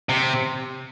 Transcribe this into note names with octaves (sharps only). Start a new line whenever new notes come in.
C3